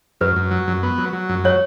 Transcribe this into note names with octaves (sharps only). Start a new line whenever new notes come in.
F#2 B4
F#2
F#3
F#2
B3
F#3
F#3
F#2
F#3 C#5